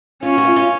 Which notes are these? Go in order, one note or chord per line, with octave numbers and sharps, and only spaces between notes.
C#4 F4
F#4
F4
F4